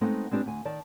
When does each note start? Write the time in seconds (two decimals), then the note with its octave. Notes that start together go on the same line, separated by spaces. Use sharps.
0.01 G#3 A3 B3 C4 D#4 F#5
0.31 G#3 C4 D4 G4 B4
0.46 D2 G#5
0.65 D#3 D5 A5